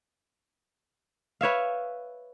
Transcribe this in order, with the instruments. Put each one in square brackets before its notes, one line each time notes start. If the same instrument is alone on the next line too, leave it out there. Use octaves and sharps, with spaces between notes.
[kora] B4 C#5 E5 F5